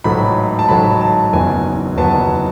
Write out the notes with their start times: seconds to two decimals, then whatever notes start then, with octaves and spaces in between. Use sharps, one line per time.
0.04 A1 G#2 F#3 A3 B5
0.59 A5
0.68 A1 G#2 F#3 A3 B5
1.01 A5
1.33 F#1 E2 D#3 F#3 B3 G#5
1.97 F#1 E2 D#3 F#3 B3 A5